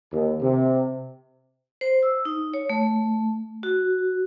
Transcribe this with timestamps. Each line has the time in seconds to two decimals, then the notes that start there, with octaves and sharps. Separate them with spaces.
0.12 D#2
0.41 C3
1.81 C5
2.03 E6
2.25 D#4
2.54 C#5
2.70 A3
3.63 F#4